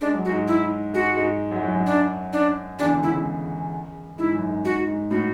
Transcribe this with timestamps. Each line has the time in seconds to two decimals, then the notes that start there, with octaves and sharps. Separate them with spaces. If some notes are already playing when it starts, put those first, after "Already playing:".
0.01 G#3 D4
0.14 F#3
0.25 F#4
0.28 G#2 G#3
0.48 E4
0.93 G#2 G#3 F#4
1.17 G#2 G#3
1.51 F#2 F#3
1.63 F#2 F#3
1.75 F#2 F#3
1.86 D4
2.33 D4
2.79 E2 E3 D4
2.90 D3
2.94 C#2 C#3
3.03 E4
3.10 C#2 C#3
4.18 G#2 E4
4.34 F#2
4.49 G#2
4.64 G#2 F#4
4.88 G#2
5.11 A2 F#4